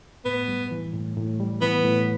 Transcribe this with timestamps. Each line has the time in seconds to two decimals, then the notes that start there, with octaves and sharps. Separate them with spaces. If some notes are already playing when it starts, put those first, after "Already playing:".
0.25 A2 B3
0.48 G3
0.71 E3
0.93 A2
1.17 A2
1.40 G3
1.61 E3 B3
1.84 A2